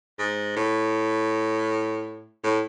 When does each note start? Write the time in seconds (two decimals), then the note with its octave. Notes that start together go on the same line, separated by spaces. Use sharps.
0.19 G#2
0.57 A2
2.44 A2